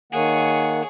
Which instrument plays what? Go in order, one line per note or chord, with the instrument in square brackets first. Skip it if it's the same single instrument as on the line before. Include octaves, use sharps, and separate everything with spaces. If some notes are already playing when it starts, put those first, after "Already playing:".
[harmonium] D#3 A#3 F#5 [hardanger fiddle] G#4 C#5